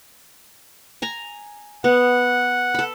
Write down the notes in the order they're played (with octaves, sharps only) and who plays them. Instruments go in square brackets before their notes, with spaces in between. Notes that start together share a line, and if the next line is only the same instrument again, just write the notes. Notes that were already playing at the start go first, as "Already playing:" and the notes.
[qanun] G#5 A#5
[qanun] B3 [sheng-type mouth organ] F#5
[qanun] A4 B5